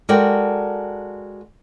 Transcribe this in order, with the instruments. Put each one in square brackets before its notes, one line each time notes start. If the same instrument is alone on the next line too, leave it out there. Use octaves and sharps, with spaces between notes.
[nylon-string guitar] G#3 F#4 A4 A#4 D5 G5